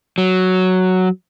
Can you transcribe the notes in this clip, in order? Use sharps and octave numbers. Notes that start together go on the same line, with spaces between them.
F#3